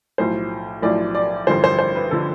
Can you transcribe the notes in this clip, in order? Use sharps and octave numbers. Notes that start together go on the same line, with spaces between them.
B1 A2 F3 C5
B1 A2 F3 D5
D5
A1 G2 D3 F3 C5
C5
C5
B4
D3 F3 A4